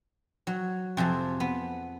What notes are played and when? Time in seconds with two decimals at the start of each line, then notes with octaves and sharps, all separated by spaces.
0.47 F#3
0.97 F2 C3 G#4 A5
1.40 B3